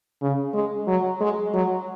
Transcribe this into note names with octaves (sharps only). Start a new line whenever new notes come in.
C#3
G#3
F#3
G#3
F#3